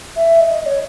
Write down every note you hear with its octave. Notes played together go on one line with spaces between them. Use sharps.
E5
D#5
D#5
C#5